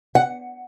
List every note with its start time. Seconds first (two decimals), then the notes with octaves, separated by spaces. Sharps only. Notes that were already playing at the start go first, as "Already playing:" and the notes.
0.15 F#5